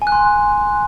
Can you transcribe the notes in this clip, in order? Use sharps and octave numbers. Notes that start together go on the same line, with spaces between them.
G#5
F#6
C6